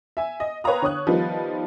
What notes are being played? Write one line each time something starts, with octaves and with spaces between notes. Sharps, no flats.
E5 G#5
D#5
B4 C#5 F5 G5 A#5 D#6
D3 C#5 D#6 F#6
D#3 F3 G3 B3 D#4 F4